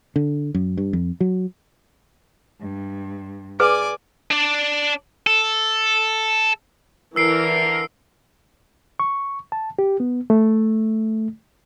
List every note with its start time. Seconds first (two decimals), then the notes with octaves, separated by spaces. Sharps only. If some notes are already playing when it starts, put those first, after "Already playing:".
0.16 D3
0.54 F#2
0.77 G2
0.93 F2
1.21 F#3
2.60 G2
3.60 G#4 B4 D5 G#5 D6
4.31 D4 D5
5.27 A4
7.16 D3 E3 A#4 E6 C7 D7
9.00 C#6
9.52 A5
9.79 G4
10.00 B3
10.30 A3